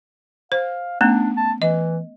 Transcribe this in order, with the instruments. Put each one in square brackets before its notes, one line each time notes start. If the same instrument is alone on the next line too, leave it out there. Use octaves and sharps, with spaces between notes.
[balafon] C5 [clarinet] F5
[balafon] A3 B3 C#4 [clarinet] D4
[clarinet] A5
[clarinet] E3 [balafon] D#5